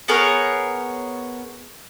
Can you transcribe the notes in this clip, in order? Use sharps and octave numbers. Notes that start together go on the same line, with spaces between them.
B3 G#4 A#4 C#5